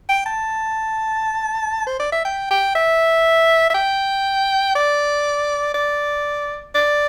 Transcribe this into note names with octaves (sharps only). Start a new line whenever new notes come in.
G5
A5
C5
D5
E5
G5
G5
E5
E5
G5
D5
D5
D5